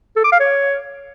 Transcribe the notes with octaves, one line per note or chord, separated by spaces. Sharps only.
A4
D6
F5
C#5